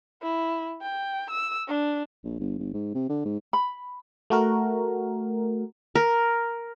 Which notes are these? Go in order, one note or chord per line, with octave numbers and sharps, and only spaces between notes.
E4
G5
E6
D4
A#1
G1
G1
G#2
C3
D3
G#2
B5
A3 F#4 A#4
A#4